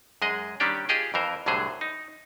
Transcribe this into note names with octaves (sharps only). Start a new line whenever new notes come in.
F#2 G#3 G#4 D#5
D#3 G3 C#4 D4 G4 D5
F4 G4 G#4 D#5 G5
F2 E3 A#4 C5
C2 A2 D3 F#3 G#4 C5
D#4